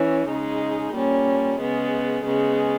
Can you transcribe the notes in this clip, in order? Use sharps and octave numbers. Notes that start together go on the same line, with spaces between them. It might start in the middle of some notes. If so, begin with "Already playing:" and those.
Already playing: E3 C#4
C#3 G#3 D#4
A#2 G3 C#4
C#3 G#3 B3
C#3 G#3 B3